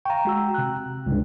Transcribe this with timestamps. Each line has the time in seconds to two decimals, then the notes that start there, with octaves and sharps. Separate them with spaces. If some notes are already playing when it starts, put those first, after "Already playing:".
0.05 F5 G5 A#5 C#6
0.25 G#3 F#4 E6
0.54 C3 F#6
1.06 C#2 G2